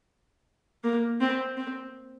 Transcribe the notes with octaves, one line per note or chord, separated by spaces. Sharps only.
A#3
C4
C4